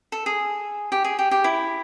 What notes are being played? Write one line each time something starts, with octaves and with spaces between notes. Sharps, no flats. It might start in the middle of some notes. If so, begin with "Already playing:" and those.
A4
G#4
G4
G#4
G4
G4
E4